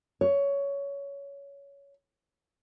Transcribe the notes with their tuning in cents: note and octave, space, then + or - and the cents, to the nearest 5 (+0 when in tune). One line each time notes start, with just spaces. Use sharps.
C#5 +15